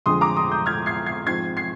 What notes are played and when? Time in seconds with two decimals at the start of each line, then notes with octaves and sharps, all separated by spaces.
0.06 F2 D3 G#3 C6 D#6
0.21 A#5 D6
0.37 C6 D#6
0.51 D#6 G6
0.66 F6 G#6
0.86 G#6 C7
1.06 G#6 C7
1.27 G#2 F3 C4 G#6 C7
1.57 G#6 C7